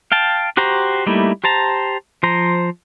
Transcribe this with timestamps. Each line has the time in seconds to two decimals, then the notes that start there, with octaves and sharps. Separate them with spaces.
0.12 F5 G5 A5
0.57 F#4 G4 C5 A#5
1.07 G3 A3 A#3 D#4 E4
1.44 G4 C5 A5 A#5
2.23 F3 C5 A#5